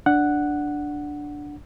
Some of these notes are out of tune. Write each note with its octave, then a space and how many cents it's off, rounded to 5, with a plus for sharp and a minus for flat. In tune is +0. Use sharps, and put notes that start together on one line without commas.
D4 +0 F#5 +0